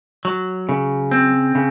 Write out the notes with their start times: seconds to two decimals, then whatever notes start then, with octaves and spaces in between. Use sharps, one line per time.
0.25 F#3
0.69 C#3
1.11 C4
1.55 C#3